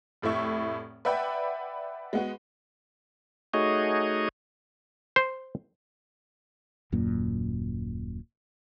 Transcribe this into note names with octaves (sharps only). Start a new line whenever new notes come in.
F1 A2 A3 E5 C#6
B4 D5 E5 F#5 G5 B5
G#3 B3 F#4
A3 D#4 F#4 G#4 C#5 D#5
C5
D#1 F#2 A#2 A#3